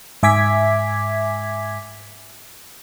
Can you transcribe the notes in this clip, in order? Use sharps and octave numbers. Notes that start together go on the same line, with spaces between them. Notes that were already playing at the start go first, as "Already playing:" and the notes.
G#2 E5 G#5 D6 G#6 B6